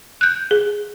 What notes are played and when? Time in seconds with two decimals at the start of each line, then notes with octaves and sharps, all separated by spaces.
0.21 F#6 G6
0.51 G#4